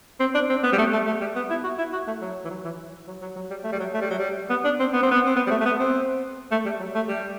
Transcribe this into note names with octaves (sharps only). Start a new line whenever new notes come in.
C4
D4
C4
B3
G3
A3
A3
A3
G3
B3
E4
F#4
E4
F#4
A3
F#3
E3
F#3
E3
F#3
F#3
F#3
G3
A3
G3
F#3
A3
G3
F#3
G3
B3
D4
C4
B3
C4
B3
C4
B3
G3
A3
A3
B3
C4
A3
G3
F#3
A3
G3